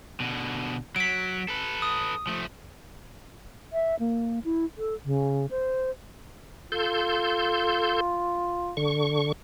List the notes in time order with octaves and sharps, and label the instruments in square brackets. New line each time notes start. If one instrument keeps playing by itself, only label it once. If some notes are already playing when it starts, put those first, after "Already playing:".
[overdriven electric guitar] B2 D3
[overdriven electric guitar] F#3 [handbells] B6 D7
[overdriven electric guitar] A4 B4
[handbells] D#6
[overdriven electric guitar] F3 A3
[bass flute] E5
A#3
E4
A4
C#3
C5
[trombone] F4 [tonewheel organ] A4 C6 G6
[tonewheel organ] D3 C#6